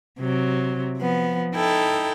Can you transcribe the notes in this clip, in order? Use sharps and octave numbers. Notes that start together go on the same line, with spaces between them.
C3 F#3
F3 B3
D#4 E4 A4 G5